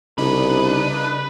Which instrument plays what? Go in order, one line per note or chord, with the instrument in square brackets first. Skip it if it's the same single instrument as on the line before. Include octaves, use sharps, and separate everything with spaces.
[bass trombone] C2 [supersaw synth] C#3 D4 D#4 [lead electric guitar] B4